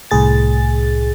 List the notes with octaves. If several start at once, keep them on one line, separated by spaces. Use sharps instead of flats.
C2 A2 G#4 A6